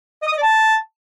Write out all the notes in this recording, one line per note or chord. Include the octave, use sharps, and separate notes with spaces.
D#5
D#6
D#5
D5
A5